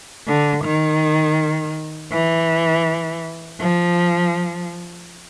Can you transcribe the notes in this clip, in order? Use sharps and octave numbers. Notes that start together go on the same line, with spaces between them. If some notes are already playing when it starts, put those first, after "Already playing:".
D3
D#3
E3
F3